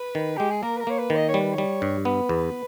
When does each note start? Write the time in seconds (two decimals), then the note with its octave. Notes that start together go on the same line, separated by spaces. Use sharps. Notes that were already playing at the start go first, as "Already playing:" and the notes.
Already playing: B4
0.15 D#3
0.37 G#3 G4
0.50 G#4
0.62 A#3 A#4
0.77 B4
0.81 A#4
0.87 A#3 C#5
0.99 B4
1.10 D#3
1.16 D#5
1.29 C#5
1.34 G3
1.40 B4
1.53 C#5
1.58 G3
1.82 G2
2.05 B3 B4
2.29 E2